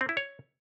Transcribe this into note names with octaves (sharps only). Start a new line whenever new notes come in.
C4
E4
C#5